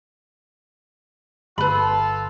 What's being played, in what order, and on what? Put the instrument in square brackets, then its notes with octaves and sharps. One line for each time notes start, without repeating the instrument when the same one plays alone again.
[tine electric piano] G1 [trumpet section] F4 A4 [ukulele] B4 B5